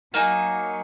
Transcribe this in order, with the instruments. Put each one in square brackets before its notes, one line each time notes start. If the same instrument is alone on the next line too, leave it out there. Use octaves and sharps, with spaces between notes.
[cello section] F#3 [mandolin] A#3 D#4 G#4